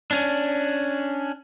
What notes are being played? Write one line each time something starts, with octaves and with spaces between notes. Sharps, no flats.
C#4 D4